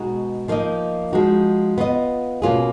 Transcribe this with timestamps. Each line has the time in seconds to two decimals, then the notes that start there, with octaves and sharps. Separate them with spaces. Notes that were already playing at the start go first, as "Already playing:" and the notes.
Already playing: B2 G#3 D#4 F#4
0.48 F3 A#3 D#4 A#4 D#5
1.13 F3 G#3 D#4 F#4
1.78 B3 F4 B4 D#5
2.42 B2 A#3 C#4 F4 G#4